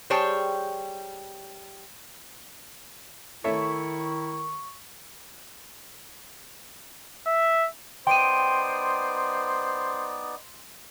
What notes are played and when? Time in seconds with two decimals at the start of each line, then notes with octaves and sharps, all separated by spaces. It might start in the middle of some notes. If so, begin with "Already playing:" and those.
0.10 G3 G#4 C5 C#5 G5 A5
3.44 D#3 A3 E4 C#5 E5 C#6
7.27 E5
8.07 B3 D#4 C5 D5 G5 C6 D7 D#7